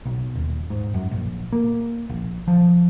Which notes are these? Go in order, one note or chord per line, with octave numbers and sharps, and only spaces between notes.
B1
D#1
G#2
F#2
A#1
A#3
A#1
F3